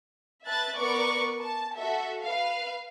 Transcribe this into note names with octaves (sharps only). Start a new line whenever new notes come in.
B4 E5 A5 F#6 A6
B3 A#4 B4 D5 C#6 D6
A5
F#4 A4 E5
B4 F5